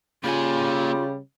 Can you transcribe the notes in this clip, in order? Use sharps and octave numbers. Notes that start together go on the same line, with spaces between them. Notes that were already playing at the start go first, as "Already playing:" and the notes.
C#3 G3 A#3 F4 G#5